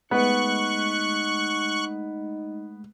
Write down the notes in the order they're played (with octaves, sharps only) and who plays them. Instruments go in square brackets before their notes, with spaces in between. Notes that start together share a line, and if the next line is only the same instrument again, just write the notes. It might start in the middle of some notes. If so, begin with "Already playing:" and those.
[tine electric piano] G#3 A3 [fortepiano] B3 [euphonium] D#4 [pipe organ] C#6 F#6